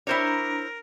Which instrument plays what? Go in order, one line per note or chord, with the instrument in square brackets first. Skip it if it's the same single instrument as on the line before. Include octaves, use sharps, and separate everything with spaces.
[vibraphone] D4 A#5 [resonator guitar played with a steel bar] E4 C5 C#5 [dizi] A#4